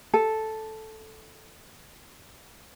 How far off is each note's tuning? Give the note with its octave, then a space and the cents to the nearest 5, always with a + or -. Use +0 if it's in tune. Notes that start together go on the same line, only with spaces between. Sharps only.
A4 -5